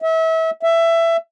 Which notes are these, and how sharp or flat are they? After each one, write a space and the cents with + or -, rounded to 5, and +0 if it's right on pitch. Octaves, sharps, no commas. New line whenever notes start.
E5 -30
E5 +15